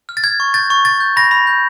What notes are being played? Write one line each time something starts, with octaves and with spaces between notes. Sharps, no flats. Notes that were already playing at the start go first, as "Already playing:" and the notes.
F6
A6
F6 G#6
C#6
G6 A6
C#6
C#6 A6
G6
B5 A#6
B5
G6